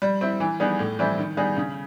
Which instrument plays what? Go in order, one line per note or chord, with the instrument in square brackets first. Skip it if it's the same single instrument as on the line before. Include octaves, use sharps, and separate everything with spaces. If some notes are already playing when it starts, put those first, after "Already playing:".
[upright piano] G3
C4 E4
E3
G3 B3 D#4 G#4
A2
E3 G3 C4 E4
D#3
G3 B3 D#4 G#4
C#3